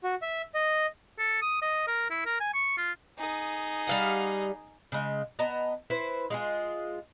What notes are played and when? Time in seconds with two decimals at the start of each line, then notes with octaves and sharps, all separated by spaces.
0.03 F#4
0.22 E5
0.55 D#5
1.19 A4
1.42 D#6
1.62 D#5
1.87 A#4
2.10 E4
2.26 A#4
2.40 G#5
2.54 C#6
2.77 F4
3.18 D#4 G#4
3.87 G3 F5 F#5
4.92 C#3 G#3
5.39 B3 D#5 A5 A#5
5.90 E4 B4 C5
6.30 G#3 F4 G#4